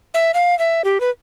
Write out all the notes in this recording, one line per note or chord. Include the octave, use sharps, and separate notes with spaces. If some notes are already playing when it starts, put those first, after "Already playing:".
E5
F5
E5
G4
B4